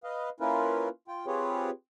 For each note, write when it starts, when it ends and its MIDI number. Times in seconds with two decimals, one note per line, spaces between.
0.04 0.29 71
0.04 0.29 75
0.04 0.29 77
0.40 0.88 58
0.40 0.88 61
0.40 0.88 64
0.40 0.88 65
0.40 0.88 70
0.40 0.88 71
1.08 1.26 65
1.08 1.26 79
1.26 1.70 60
1.26 1.70 65
1.26 1.70 67
1.26 1.70 68
1.26 1.70 71
1.26 1.70 73